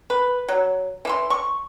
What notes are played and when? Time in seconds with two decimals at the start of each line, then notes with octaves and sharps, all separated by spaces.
0.10 B4
0.48 F#3
1.05 E3 E5 C6
1.30 C#6